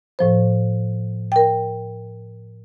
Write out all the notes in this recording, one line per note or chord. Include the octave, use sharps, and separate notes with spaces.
A2 F3 C5
A#4 G5